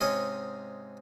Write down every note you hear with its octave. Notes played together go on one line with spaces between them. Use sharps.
G#2 C3 C#4 C#5 D#5 D#6